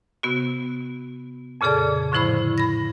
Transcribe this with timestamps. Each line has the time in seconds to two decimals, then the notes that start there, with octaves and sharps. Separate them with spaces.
0.23 C3 B3 F#4
1.61 F2 A#2 C#3 G#4 A4 D5
2.12 A2 D3 F3 E4 C5 B5
2.58 B5 A#6